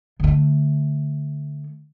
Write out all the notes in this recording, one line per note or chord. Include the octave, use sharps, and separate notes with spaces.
D3 A3